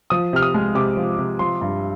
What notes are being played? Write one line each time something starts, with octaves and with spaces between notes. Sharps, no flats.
F3 D#6
C3 F6
D#6
G#3
C3 D6
F3
C3
F3 C6
G2